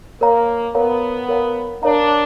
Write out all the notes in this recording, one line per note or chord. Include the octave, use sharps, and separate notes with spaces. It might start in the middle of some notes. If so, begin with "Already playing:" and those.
A#3 A#4 C#5 F5 A#5
B3 A#4 C#5 F5 A#5
A#4 C#5 F5 A#5
D4 A#4 C#5 F5 A#5